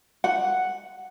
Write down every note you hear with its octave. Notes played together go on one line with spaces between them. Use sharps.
F#5